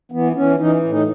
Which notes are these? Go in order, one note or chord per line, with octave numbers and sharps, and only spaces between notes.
E3 B3
E3 C#4
E3 D#4
A2
D#4